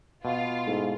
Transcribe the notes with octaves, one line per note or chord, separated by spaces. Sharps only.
B2 F4
G#2 A3 E4